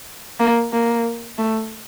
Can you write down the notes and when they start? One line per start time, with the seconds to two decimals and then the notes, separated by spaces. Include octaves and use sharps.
0.40 A#3
0.73 A#3
1.38 A3